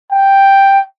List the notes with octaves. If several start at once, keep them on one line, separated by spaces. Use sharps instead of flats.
G5